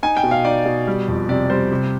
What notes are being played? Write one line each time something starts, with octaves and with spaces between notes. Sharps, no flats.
D#4 G#5
G5
B2
F5
D#4 D5
B2
G3
F2
C3 D5
G3 C5
C3